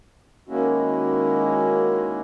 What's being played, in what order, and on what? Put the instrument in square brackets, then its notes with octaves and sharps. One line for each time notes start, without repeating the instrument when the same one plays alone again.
[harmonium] D#3 G#3 A#3 C#4 E4 F#4